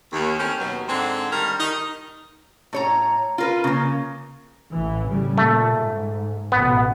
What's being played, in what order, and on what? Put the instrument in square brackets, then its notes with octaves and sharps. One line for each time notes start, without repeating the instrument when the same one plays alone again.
[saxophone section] D#2
A3 C4 C#4
D#2 B2 F#3
G#2 D3 G#3 C4
D3 D#3 G3 A#4
D#3 D#4
[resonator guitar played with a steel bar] A2 C#5 A#5
F4 A#4 B4
C#3 A#3
[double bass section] A1 E3
A2 C#3 G3
[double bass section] A#2 [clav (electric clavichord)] A3
[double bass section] G#2
[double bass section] A1 B2 [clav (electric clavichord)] B3